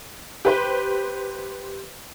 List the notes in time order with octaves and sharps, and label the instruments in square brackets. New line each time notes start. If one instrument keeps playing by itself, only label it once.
[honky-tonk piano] G4 B4 C5